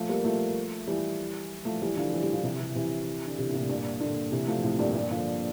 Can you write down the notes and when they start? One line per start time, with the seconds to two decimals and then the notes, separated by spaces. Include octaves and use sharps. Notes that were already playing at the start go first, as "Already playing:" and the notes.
Already playing: F3 A3
0.09 G3 A#3
0.24 F3 A3
0.87 E3 G3
1.65 F3 A3
1.82 E3 G3
1.97 D3 F3
2.13 E3 G3
2.23 E3 G3
2.33 D3 F3
2.43 C3 E3
2.60 C3 E3
2.75 C3 E3
3.27 D3
3.38 C3 E3
3.50 A#2
3.54 A2 C3
3.69 G2 A#2
4.00 A#2 D3
4.32 C3 E3
4.48 F3 A3
4.63 A2 C3
4.79 G2 A#2
4.95 G2 A#2
5.11 D3 F3